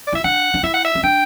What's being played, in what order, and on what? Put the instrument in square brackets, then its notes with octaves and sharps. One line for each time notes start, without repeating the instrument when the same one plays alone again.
[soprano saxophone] D5
[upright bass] E4 [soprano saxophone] E5
[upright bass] D4 [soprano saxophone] F#5
[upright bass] D4
[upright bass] E4 [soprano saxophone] E5
[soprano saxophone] F#5
E5
[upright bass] C#4
[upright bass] D4 [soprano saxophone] G5